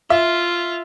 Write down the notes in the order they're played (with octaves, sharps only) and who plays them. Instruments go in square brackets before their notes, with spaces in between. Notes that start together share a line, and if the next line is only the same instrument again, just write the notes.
[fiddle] F4 [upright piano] E5